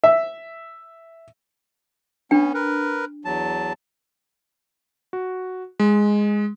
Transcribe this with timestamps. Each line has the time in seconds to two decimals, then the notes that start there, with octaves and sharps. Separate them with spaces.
0.04 E5
2.31 B3 C#4 D4 G5
2.54 A#4 B4
3.25 E2 F#3 A5
5.13 F#4
5.80 G#3